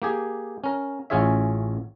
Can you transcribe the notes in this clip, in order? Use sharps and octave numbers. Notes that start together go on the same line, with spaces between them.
A#3 G4 G#4
C#4 A#4
A1 C#4 F4 G#4 C#5 E5